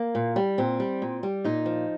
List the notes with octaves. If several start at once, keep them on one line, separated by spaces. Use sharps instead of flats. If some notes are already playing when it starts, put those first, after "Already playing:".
Already playing: A#3
A#2
G3
A#2 C4
G3
A#2
G3
A#2 D#4
F3